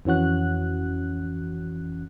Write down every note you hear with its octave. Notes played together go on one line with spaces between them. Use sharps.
F2 E3 C#4 F#4 F#6